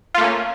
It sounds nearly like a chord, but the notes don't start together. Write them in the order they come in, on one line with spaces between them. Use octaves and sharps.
F4 A3 A#3 C#4